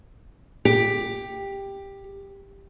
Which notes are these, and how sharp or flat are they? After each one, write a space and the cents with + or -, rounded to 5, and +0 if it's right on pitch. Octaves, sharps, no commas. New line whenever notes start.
G4 +10